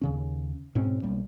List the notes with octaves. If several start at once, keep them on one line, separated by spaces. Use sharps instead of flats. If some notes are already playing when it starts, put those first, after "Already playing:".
D#2 C#3 C#4
G#2 B2 C4 C#4
B1 G3 A#3